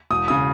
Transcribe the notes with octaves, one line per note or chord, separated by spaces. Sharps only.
E1 D#6
C#3 D#6